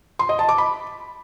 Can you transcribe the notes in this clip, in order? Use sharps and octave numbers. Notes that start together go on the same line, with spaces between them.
C6
D#5
A5
D6
B5